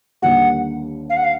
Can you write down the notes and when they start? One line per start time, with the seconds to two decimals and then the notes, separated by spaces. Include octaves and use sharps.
0.22 D#2 D3 G3 A#3 F#5
1.10 F5
1.17 F#5
1.24 F5